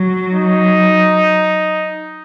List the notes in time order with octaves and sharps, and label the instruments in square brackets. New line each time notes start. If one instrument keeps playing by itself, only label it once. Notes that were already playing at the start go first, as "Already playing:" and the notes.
Already playing: [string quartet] F#3
[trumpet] D#4